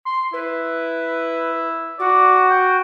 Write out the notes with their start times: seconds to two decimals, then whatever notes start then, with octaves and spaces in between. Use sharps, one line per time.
0.06 C6
0.33 E4 B4
1.99 F#4 D5
2.50 G5